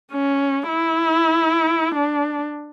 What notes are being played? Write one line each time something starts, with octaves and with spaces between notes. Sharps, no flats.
C#4
E4
D4